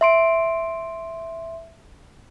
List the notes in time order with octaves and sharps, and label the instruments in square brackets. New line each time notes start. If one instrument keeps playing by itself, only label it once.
[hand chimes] E5 C6 D7